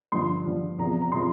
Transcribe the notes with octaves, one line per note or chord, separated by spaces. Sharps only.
G2 D3 F3 C6
G2 D3 F3
E2 C3 F3 A#5
A#5
C3 F3 C6